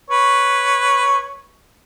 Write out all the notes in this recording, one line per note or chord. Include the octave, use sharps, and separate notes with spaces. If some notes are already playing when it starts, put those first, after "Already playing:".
B4 C#5